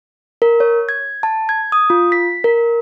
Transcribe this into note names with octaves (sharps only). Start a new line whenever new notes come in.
A#4
C#5
G#6
A5
G#6
D#6
F4
B6
A#4